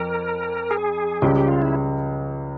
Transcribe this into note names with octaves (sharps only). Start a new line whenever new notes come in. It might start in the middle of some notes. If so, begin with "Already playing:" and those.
Already playing: F2 A#4
G#4
C#2 C#3 G3 G4
G4
F4
E4